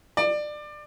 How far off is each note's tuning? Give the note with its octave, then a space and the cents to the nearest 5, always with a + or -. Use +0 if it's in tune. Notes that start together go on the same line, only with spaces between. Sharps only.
D5 +25